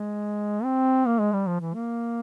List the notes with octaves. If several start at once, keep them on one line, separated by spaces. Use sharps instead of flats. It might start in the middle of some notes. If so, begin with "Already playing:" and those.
Already playing: G#3
C4
A#3
G#3
G3
F3
E3
A#3